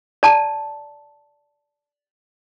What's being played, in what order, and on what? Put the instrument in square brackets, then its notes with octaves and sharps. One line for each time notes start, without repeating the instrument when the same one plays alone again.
[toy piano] D5 A5 A#5